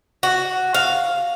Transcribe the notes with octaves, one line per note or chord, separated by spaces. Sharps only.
F#4
F5